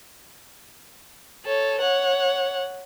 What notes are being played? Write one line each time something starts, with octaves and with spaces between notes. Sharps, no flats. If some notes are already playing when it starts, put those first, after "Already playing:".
A4 C#5
C#5 F#5